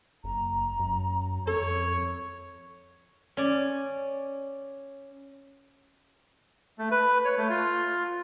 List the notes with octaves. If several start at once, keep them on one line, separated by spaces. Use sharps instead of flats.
F#1 A#5
F#2
F2 A4 C#5
C#4 D5
A3
B4
C#5
A3
F4